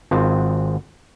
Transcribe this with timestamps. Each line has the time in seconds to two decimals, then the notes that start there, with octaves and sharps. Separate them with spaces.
0.11 G#1 C4 F4 D#5 A5